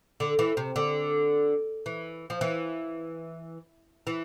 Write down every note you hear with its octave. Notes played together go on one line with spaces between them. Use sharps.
D3
E3
C3
D3
E3
F3
E3
E3